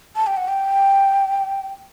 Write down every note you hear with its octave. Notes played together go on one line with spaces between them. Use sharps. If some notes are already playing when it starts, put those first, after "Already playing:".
A5
G5
F#5
G5